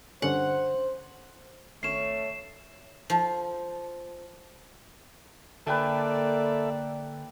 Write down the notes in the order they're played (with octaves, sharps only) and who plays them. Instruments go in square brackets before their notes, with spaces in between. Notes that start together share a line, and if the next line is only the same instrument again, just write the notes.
[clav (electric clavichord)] G2 D3 C#4 [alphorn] C5 [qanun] F#5
[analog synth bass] G#1 [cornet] A3 [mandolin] C#4 C#5 [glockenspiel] C7 E7
[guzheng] F3
[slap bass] D3 [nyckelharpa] A#3 D5 [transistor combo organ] A4 E5 [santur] B4 G5 A5